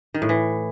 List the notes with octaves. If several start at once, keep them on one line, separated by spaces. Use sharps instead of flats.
D#3
A2
E3